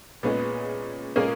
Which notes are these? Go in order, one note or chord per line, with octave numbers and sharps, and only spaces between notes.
A#2 G#3 B3 C#4 G#4
A#2 G#3 A#3 C#4 G#4